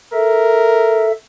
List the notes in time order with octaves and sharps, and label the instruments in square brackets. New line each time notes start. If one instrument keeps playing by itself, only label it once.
[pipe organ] A4 E5 [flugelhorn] A#4